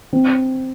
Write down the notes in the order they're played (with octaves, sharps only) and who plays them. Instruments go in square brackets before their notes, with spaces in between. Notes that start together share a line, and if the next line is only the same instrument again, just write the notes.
[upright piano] C4